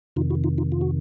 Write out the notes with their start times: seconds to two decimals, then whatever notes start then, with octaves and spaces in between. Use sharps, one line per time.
0.16 F2 C3 D#3 D#4 F4
0.30 E4 F#4
0.44 D#4 F4
0.58 D#4 F4
0.72 F4
0.81 F#4